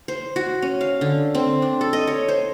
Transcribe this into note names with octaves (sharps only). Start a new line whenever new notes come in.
C5
F#4
C#4
F5
D3
C4
D4
A4
D#5
C#5
C5